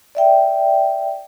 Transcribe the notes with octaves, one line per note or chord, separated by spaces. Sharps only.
D5 E5 G5